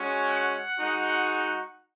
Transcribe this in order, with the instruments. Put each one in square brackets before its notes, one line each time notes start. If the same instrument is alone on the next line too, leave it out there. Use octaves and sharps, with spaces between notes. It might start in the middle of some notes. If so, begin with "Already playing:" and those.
Already playing: [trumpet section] G#3 C#4 F#4
F#5
G#3 D#4 F#4